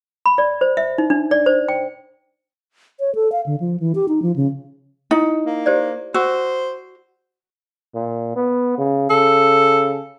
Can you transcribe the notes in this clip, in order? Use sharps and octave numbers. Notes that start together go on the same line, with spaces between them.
B5
D5
C5
E5
D#4
D4
D5
C5
G5
C#5
A4
F5
D3
F3
E3
G4
D#4
F3
C#3
D#4 E4 D#6
A#3
G4 C5 D5
F#4 C5 E6
A#2
B3
C#3
C#3 A4